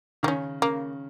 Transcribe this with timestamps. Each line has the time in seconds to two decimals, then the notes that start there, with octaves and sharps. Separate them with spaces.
0.23 D#3 A#3
0.28 C#3 C#4
0.62 C#3 A#3